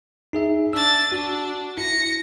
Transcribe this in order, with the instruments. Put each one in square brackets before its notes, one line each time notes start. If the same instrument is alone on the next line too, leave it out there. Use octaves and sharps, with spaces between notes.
[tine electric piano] D#4 G#4 E5
[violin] D4 A6 [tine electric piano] E6
[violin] D4 [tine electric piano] F#4
[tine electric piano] E4 [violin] A#6 C#7